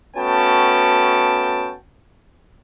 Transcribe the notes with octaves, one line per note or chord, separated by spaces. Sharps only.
A3 B3 C#4 F#4 G5 A5